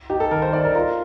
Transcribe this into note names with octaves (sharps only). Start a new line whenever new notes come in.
D#4 G4
A4
D#3 A#4
C5
D#4 D5
A#4
F4 A#4